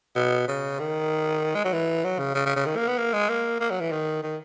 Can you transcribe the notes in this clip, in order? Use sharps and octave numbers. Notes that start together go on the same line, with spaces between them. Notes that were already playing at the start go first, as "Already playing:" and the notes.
B2
C#3
D#3
G#3
F#3
E3
F#3
C#3
C#3
C#3
C#3
D#3
A#3
B3
A#3
G#3
A#3
A#3
F#3
E3
D#3
D#3